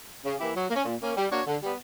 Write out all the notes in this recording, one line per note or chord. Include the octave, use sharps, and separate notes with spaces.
C#3
E3 A#3 E4 G4
F#3
A#3
C#4
A#2
A#3 C#4
G3
A#3 D4 F#4 C#5
D3
G3 B3